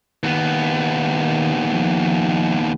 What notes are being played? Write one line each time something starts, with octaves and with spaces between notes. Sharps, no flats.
D#2 D#3 B3
F3